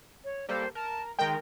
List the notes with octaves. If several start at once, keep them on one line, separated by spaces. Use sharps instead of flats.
C#5
G3 A#3 A4 C5
A#4 A5
D#3 G#3 A#4 G5